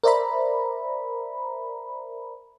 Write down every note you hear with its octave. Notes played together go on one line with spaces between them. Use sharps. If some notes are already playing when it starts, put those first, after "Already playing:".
A#4 C5 D5 E5 A#5 B5